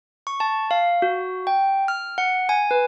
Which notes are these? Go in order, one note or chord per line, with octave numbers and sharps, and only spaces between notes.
C#6
A5
F5
F#4
G5
F6
F#5
G#5
B4